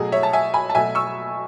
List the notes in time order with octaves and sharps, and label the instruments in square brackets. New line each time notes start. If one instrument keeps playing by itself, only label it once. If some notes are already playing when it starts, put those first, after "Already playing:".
Already playing: [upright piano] B2 F#3 A3 G#4
C#5 E5
A5
E5 G#5
G#5 B5
A5
B2 F#3 A3 E5 G#5
C#6 E6